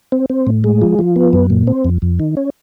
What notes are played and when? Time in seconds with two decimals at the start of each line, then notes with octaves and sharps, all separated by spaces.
0.12 C4
0.30 C4
0.47 A2
0.64 G#3
0.82 F3
0.99 F3
1.16 B3
1.33 F#2
1.50 A#2
1.67 C4
1.85 F2
2.02 F2
2.20 D#3
2.37 C#4